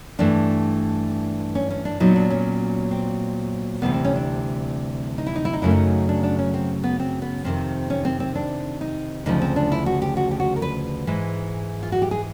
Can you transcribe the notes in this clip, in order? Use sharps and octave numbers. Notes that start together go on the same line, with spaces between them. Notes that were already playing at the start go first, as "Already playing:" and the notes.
G2 E3 A3 D4
C#4
C#4
D4
A#2 F#3 B3 D#4
D4
C#4
C4
D2 C3 E3 G3 B3
C4
C#4
D4
D#4
E4
D#4
E4
D#4
F#2 C#3 F#3 A3 E4
D#4
D4
D4
C#4
C4
B3
C4
B3
F2 C3 D#3 C4
C#4
C4
C4
D4
D#4
D2 C#3 F3 D#4
C4
D4
E4
F#4
G4
F#4
G4
F#4
A#4
B4
G#2 E3 G#3
F4
F#4
G4
G#4